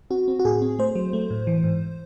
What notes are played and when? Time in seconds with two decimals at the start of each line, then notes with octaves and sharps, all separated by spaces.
0.10 C4 F#4
0.28 C4
0.39 F#4
0.45 A2 G#4
0.62 C4
0.79 A3 C5
0.95 F#3
1.13 A3
1.30 A2
1.47 E3
1.64 G#2